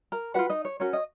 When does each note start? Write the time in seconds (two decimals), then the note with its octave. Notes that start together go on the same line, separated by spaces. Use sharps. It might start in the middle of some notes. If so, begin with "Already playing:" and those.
0.12 A#4 A#5
0.34 F#4 B4 F#5
0.39 F4
0.50 D#4 D#5
0.65 C#5
0.80 C#4 F#4 A#4 C#5
0.93 D#5